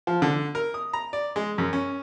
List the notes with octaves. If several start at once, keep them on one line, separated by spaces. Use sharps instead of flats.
F3
D3
A#4
D#6
A#5
D5
G#3
F#2
C#4